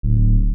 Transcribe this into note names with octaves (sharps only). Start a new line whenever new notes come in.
D1